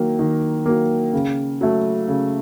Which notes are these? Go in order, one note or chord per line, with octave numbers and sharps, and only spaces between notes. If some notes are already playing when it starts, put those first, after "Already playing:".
Already playing: D#3 F#3 A#3
D#3
F#3 A#3
C#3
F#3 A3
C#3